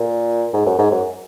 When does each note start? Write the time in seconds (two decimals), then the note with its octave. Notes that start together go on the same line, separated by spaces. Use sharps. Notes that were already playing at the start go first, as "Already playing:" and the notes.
Already playing: A#2
0.54 G#2
0.66 F#2
0.78 G#2
0.91 F#2